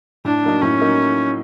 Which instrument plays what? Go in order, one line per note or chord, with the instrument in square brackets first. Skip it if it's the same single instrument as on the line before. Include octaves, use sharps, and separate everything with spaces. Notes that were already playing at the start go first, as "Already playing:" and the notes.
[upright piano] A2 [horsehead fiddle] D4
[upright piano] F#3 A#3 D#4
[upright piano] A2 [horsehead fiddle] C#4
[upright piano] F#3 A#3 D#4